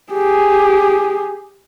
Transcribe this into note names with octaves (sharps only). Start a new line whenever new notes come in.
G4 G#4